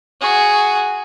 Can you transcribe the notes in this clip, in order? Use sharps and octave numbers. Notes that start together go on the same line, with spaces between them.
F#4 G#4